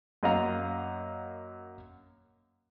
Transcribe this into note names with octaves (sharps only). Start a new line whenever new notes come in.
F#2 A#3 D#5 F5 F#5 A#5